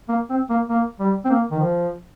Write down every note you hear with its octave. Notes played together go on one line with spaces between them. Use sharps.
A#3
C4
A#3
A#3
G3
C4
A#3
D#3
F3